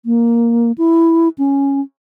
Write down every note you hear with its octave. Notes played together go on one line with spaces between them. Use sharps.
A#3
E4
C#4